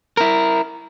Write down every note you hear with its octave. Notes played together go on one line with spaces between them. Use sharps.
E4 A#4